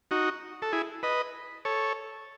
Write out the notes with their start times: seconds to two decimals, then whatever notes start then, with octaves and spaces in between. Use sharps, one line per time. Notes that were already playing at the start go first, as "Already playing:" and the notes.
0.11 D#4 F#4
0.62 A4
0.73 E4 G#4
1.03 B4 D#5
1.65 A4 C#5